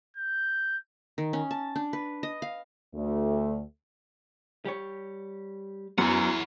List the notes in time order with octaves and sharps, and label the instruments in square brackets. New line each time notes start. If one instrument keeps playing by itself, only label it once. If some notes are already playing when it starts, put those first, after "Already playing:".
[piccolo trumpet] G6
[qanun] D#3
C#4
A5
D4
B4
D#5
F5
[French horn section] D2 A3
[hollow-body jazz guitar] G3 G4 C#5
[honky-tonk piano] F#2 [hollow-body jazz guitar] B3 [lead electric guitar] E4 F#5